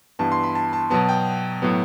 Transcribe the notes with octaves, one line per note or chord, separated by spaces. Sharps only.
G2 E3 B3 A5
C6
B5
A5
A5
B2 F#3 B3 A5
G5
A2 F#3 B3